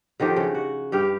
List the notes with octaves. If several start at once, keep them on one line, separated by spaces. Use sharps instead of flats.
D3 D#3 F3 G4
C#3 F#4
F#4
G2 G4 F5 G5